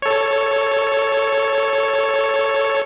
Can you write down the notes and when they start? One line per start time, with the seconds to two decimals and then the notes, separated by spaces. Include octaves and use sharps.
0.02 A4 C#5